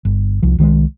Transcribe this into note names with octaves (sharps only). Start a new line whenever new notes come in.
G1
C2 F3
C2 D#3 F#3 G#3